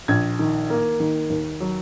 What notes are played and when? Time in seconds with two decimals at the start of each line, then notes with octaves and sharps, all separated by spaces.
0.08 A#1 G#6
0.39 D#3
0.70 A#3
1.00 D#3
1.30 D#2
1.60 F#3